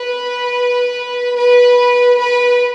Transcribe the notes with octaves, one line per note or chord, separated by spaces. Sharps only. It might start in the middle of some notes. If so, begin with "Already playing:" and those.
Already playing: B4
B4
B4